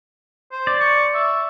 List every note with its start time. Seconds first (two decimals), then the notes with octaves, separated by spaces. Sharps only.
0.52 C5
0.67 D5
0.81 C#6
1.14 E5